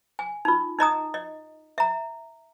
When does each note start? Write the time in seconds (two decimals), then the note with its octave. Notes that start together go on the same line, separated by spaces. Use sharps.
0.19 G#5
0.45 D#4 F4
0.79 D#4 D#5 A#5 D#6
1.14 D#5
1.78 E5 A#5